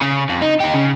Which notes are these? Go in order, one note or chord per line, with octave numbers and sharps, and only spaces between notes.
C#3
F2
D#4
D#4 G4
C#3